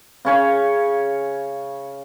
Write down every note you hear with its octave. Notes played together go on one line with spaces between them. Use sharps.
C#3 C#4 C#5